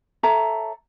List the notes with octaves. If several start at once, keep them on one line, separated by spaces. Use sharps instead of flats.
A4 C#5 E5 A#5